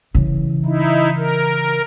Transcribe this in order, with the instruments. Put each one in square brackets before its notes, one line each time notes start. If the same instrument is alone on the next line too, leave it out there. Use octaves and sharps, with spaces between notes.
[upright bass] C#3 E3
[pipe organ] D#4 E4
A#4